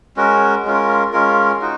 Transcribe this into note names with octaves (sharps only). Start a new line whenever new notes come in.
G#3 C#4 F#4 A#4
G#3 C#4 F4 A#4
G#3 C#4 F4 A#4
D#4 F#4